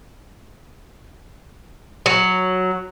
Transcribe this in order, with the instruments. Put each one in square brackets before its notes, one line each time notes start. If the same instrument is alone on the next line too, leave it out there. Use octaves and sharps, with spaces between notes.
[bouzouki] F#3